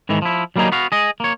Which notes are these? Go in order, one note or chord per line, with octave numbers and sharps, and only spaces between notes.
G#2 D#3 E3
F3 E4
F#3 G3 A#3 C4 D#4 G#4
B3 F#4 F5
G#4 D#5
A#3 C#5